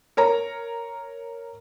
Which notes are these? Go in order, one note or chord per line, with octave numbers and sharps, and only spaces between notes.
A#4 C#5 A#5